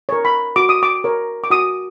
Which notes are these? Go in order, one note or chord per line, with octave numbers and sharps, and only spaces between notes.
A#4 C#5
B5
F#4 D6
D#6
D6
A#4 C#5
D6
F#4 D#6